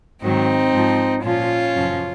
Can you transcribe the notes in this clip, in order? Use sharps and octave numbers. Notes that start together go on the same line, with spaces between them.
G#2 D#3 F#3 C4 D#4
G#2 F3
A#2 F3 C#4 F4
F#2 C#3 F3